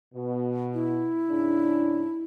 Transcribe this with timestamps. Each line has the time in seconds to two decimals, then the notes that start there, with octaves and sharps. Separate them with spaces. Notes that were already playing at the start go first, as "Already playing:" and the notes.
0.14 B2
0.74 E4
1.29 G#2 C#3 D4